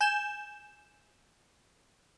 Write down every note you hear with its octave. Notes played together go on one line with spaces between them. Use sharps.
G#5 G6 E7